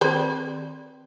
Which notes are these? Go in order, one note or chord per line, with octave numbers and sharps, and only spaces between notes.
D#3 C4 B4 C5 D5